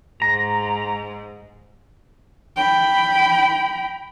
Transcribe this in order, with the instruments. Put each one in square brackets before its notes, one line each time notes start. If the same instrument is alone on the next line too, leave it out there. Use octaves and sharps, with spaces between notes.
[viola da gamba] G#2 [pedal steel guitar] A#5
[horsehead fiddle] G5 B5